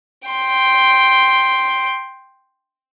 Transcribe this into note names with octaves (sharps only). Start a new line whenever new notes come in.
G5 C6